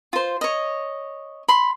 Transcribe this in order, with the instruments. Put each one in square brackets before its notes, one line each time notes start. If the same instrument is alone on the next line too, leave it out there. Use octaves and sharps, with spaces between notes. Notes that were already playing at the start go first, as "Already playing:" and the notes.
[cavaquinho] F4 C5
C#5 D#5
B5 C6